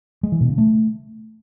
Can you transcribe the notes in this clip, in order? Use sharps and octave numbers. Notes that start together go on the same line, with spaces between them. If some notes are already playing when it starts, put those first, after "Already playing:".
G#3
E3
B2
C#3
A3